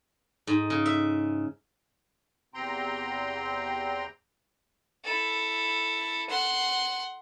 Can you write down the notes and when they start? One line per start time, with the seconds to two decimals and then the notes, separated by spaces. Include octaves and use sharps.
0.47 G#2
0.70 C#3
0.86 E5
2.54 E2 C3 C4 G5 A#5 C6
5.05 E4 A4
6.30 F#5 C6